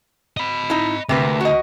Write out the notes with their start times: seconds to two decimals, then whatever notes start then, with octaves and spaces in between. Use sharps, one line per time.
0.37 D#5 B5
0.70 D#4 E4
1.09 D2 C3 A#3 B4
1.41 F#4 D#5